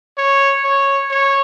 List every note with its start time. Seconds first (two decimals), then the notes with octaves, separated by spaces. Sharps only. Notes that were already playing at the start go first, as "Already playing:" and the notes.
0.18 C#5
0.64 C#5
1.11 C#5